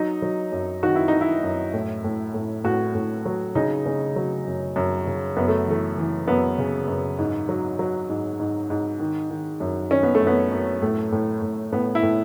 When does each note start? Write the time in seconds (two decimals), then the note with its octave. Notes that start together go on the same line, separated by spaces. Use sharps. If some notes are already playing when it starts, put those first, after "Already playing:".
Already playing: F#3 D#4
0.22 F#3
0.52 F#2
0.83 D#3 F#4
0.95 E4
1.08 D#3 D#4
1.21 E4
1.43 F#2
1.74 A2
2.04 A2
2.34 A2
2.64 A2 F#4
2.95 A2
3.26 F#3
3.55 C#3 D#4
3.86 C#3
4.16 F#3
4.46 F#2
4.76 F#2
5.07 C#3
5.37 F#2 B3
5.48 A3
5.67 E3 A3
5.98 E3
6.27 F#2 B3
6.58 C#3
6.88 F#2
7.19 G#2
7.49 F#3
7.79 F#3
8.10 G#2
8.40 G#2
8.70 G#2
9.00 D#3
9.30 D#3
9.60 F#2
9.91 D#3 C#4
10.03 B3
10.15 A3
10.21 F#2
10.27 B3
10.51 F#2
10.82 A2 A3
11.12 A2
11.42 A2
11.72 A2 B3
11.95 E4
12.03 A2